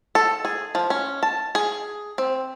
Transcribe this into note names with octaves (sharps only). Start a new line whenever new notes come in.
A4
G#4
F3
C#4
A5
G#4
C4